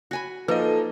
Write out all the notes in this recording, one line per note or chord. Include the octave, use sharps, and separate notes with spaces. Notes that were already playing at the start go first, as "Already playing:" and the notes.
F#4 G#5 B5
F3 A#3 D#4 A4 B4 D#5